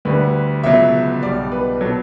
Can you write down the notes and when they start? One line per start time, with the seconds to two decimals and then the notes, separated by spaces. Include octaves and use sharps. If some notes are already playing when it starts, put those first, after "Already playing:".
0.05 D2 D3 G3 B4
0.64 C#2 B2 F#3 E5
1.23 B1 B2 G3 D5
1.52 B4
1.81 B2 F#3 A4